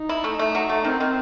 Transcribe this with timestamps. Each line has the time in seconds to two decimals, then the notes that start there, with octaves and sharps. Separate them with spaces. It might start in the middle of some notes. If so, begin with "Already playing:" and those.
Already playing: D#4
0.09 E4
0.24 A3
0.39 A3
0.55 F#3
0.69 A3
0.85 D#3 C4
1.00 D#3